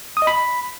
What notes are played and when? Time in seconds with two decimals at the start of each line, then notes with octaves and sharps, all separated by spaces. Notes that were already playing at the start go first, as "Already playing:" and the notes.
0.17 D#6
0.22 D#5
0.27 B5